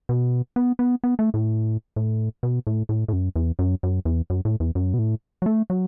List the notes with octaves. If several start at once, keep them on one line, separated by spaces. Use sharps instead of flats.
B2
B3
B3
B3
A3
A2
A2
B2
A2
A2
A2
F#2
E2
F#2
F#2
E2
F#2
A2
E2
F#2
B2
A2
F#3
A3
F#3